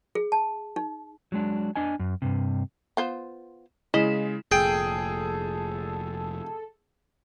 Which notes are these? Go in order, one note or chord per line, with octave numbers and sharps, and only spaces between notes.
G#4
A5
D#4
F#3 G#3 D4
D4 D#5 G#5
F#2
G2 C3
B3 F4 C5
C#3 G#3 E4 D#5
F1 A#2 G#4 A4 G5 D7